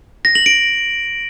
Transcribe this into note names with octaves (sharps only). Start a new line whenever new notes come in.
A#6
F#7
D7